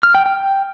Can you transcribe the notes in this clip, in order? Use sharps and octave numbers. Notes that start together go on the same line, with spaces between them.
F6
G5
G5